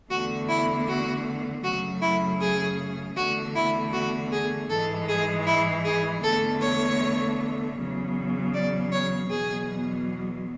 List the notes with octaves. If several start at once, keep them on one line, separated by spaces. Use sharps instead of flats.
E2 D3 A3 F#4
E4
F#4
F#2 C#3 F#3 A3 F#4
E4
G#4
E2 D3 A3 F#4
E4
F#4
G#4
G#2 E3 G#3 A4
G#4
E4
G#4
E2 D3 A3 A4
C#5
E2 C#3 F#3
D5
C#5
E2 B2 F#3 G#4